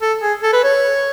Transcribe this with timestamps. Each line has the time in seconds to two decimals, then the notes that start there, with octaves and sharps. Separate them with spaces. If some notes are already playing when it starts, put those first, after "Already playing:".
0.02 A4
0.22 G#4
0.43 A4
0.53 B4
0.64 C#5